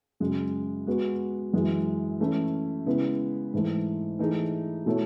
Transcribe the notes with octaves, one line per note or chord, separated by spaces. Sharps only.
F#2 C#3 G#3
G#3 B3 F#4
F#2 E3 G#3
E3 A3 C#4 E4
C#3 G#3 B3 E4
G#2 E3 A3
E3 A3 D#4 G#4
B2 A3 E4 A4 C#5